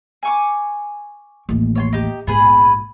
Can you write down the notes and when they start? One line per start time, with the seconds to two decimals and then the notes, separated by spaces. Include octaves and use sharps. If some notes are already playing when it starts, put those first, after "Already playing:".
0.23 G#5 C#6 D6
1.49 A1 D#2
1.75 C#5 G#5 C6
1.93 D#4 G4
2.27 A#1 G#2 B3 G#4 B4